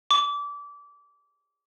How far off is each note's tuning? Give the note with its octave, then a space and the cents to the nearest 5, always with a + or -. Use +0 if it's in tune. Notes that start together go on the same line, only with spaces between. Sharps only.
D6 -25